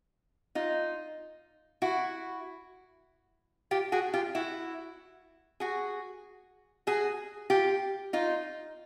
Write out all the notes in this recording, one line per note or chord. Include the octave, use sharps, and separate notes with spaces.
D#4 F4
E4 F#4
F4 G4
F#4 G#4
F4 G4
E4 F#4
F#4 G#4
F#4 G#4
F4 G4
D#4 F4